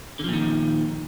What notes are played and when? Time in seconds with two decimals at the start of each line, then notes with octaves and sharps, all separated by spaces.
0.19 D3
0.24 F3
0.29 A#2
0.33 D#3